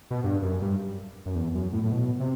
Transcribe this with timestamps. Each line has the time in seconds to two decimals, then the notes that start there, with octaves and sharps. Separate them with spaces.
0.10 B2
0.24 G2
0.42 F#2
0.62 G2
1.26 F#2
1.35 E2
1.55 F#2
1.73 A2
1.84 A2
1.92 B2
2.19 C3